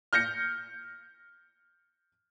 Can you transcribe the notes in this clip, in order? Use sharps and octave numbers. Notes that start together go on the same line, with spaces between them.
F6 G6 A#6 C#7